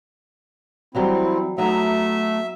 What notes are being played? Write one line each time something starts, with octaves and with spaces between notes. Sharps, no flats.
E3 F#3 G3 C4 E4
F#3 A3 B3 D#4 E5